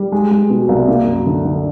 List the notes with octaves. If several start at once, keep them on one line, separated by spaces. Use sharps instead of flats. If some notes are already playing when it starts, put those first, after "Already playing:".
Already playing: G3
G#3
G#3
B2
C2
A#3
F#2
D3
D3